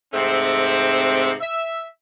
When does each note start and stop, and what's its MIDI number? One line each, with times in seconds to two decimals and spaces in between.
0.13 1.34 44
0.13 1.34 48
0.13 1.34 57
0.13 1.34 60
1.41 1.84 76